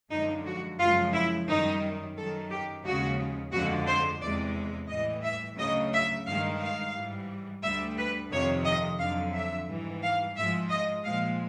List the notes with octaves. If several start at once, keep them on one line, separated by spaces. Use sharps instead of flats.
F#2 D3 F3 G#3 D#4
F#4
F#2 C#3 F3 G#3 F4
E4
F#2 D#3 G3 D#4
F#2 D#3 F#3 A4
G4
D#2 C#3 F3 G#3 F#4
F2 D3 F3 G#3 F#4
C5
E2 C3 E3 G#3 D5
A2 E3 G3 D#5
E5
D2 C#3 F#3 D#5
E5
G2 D#3 G#3 F5
F5
G#2 E3 G3
D2 D3 G3 E5
B4
F2 C3 D#3 C#5
D#5
F2 D3 F#3 F5
E5
G#2 E3 G3
F5
G#2 F3 G#3 E5
D#5
A#2 F3 G#3 F5